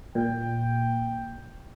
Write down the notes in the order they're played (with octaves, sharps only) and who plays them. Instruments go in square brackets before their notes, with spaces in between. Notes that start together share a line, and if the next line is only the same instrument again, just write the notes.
[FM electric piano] A#2 [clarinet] G5